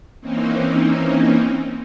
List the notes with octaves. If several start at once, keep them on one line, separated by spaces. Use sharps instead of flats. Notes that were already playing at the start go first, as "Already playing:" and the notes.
E3 A#3 C4 C#4 D#4